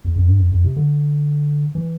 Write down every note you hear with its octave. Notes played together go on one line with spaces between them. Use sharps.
E2
F2
G2
F2
F2
C3
D3
E3